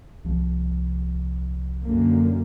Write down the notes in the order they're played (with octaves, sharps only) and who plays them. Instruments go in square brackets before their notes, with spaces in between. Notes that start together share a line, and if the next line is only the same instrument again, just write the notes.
[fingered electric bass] C2 F3
[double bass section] F#2 D3 A#3